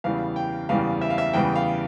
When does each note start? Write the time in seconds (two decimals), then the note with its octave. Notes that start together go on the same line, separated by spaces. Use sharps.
0.04 E2 C#3 E3 G3 F5
0.36 G5
0.69 E2 C#3 E3 G3 F5
1.01 E5
1.10 F5
1.18 E5
1.33 E2 C#3 E3 G3 G5
1.56 F5